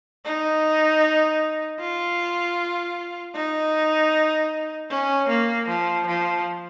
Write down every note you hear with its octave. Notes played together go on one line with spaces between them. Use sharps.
D#4
F4
D#4
C#4
A#3
F3
F3